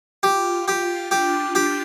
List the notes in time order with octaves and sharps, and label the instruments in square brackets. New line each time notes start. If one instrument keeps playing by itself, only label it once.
[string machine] F4 [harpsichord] G4
[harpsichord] G4
[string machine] D4 [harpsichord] G4
[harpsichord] G4